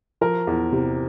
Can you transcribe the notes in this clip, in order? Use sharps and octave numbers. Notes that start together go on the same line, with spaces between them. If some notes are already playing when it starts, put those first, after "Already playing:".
F3 A#4
E2
C3